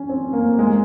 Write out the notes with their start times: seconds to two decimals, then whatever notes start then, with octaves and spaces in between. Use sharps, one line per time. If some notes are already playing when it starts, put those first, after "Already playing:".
Already playing: C#4
0.09 C4
0.33 A#3
0.59 G#3